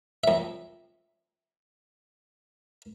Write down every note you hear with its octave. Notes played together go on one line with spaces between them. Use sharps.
F2 E5